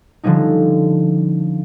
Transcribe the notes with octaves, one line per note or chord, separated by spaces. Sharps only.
D3 F3 G3 C#4 D#4